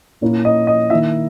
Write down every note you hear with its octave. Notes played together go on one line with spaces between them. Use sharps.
A#2 A#3 C#4 E4
D#5
D#5
D#3 A#3 E4 E5